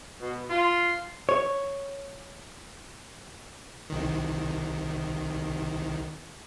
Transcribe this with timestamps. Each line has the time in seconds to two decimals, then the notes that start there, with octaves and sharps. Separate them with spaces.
0.21 B2
0.50 F4
1.29 C#5
3.90 C2 D#3